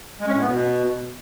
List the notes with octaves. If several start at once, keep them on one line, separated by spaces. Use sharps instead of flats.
G#3
C#4
A2
B3
B2